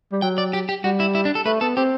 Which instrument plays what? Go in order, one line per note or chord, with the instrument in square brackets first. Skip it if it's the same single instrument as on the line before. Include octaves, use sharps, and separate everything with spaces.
[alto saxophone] G3
[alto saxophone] F#3 [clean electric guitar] G5
[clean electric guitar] D5
G4
G4
[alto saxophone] G3 [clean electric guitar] F#4
[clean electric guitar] E4
E4
D4
A4
[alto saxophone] A3 [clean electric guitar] B4
[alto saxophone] B3 [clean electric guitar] A4
[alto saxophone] C4 [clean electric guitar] G4